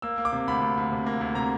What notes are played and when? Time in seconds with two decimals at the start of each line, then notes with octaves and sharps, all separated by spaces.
0.02 A#3 E6
0.18 A#3
0.25 D6
0.33 C3
0.47 D2 B5
0.62 D2
0.77 D2
0.92 C3
1.06 A#3
1.21 D2
1.35 C3 A#5